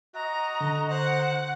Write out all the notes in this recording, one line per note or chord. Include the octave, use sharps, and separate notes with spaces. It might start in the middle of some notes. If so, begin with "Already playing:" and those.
F#4 D#5 A#5
D3
C5 F#5